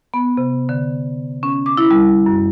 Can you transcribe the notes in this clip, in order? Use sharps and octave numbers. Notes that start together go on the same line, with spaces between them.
B3
C3
D3
C#4
D6
E4
G3
F#2